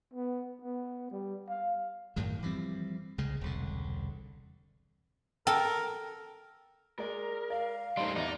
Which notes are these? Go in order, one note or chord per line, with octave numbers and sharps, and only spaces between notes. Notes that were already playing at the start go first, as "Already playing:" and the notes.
B3
B3
G3
F5
F#2 A2 D#3
E3 F3 G3 C4
C2 C#3 G#3
E1 C2 D3
A4 A#4 G5
G#3 A#4 D5
D5 F5
G3 A3 D4 D#4 C5 C6
E2 C3 D#4 D5